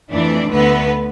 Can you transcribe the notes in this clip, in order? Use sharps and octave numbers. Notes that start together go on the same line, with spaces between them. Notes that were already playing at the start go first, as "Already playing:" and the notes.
F2 E3 A3 D4 D5
D2 D3 A3 B3 B4